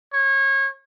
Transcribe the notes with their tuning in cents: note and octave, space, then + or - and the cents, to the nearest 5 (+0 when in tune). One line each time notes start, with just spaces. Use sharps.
C#5 -25